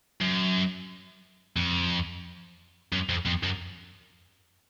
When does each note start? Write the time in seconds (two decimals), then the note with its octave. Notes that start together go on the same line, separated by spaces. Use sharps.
0.21 F#2
1.57 F2
2.93 F#2
3.09 F2
3.26 F2
3.43 F#2